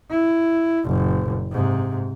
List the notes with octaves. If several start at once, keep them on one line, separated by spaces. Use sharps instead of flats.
E4
F#1 A#2
G#2 C3